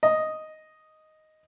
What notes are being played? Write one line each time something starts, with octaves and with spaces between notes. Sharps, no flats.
D#5